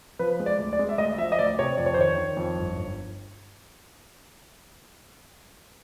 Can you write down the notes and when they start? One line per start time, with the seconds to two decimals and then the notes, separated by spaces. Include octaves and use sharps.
0.19 F3 B4
0.40 G#3
0.46 D5
0.58 D2
0.73 D5
0.79 G#3
0.89 E5
0.98 D2 D#5
1.18 F3 E5
1.32 D#5
1.39 D2 D5
1.59 C3 C#5
1.78 F2 D5
1.86 C#5
1.94 C5
1.98 D#3 C#5
2.18 D#3
2.37 F2
2.58 G1
2.77 G1